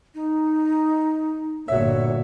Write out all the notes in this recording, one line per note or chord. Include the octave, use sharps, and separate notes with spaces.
D#4
G1 A#2 F#4 C#5 E5